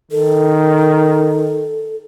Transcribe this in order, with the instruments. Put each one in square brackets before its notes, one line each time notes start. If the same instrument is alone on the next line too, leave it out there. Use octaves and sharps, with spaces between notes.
[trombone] D#3 [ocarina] A4